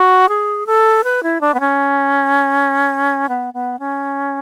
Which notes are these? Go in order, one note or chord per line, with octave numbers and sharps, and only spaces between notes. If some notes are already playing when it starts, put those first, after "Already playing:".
Already playing: F#4
G#4
A4
B4
E4
D4
B3
C#4
B3
B3
C#4